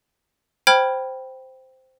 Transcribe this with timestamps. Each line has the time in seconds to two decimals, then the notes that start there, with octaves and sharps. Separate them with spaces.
0.67 C5 G5 B5 F6 G#6